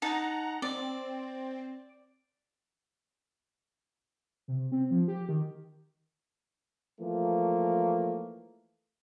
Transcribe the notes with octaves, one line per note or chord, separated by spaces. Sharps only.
D#4 F#5 A5 A#5
C4 D5
C3
C4
F3
G4
D#3
E3 F3 A3 A#3